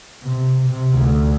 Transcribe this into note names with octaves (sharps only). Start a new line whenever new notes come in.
C3
C3
D2